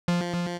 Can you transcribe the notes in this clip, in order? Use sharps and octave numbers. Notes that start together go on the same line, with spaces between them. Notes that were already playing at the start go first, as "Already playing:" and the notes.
F3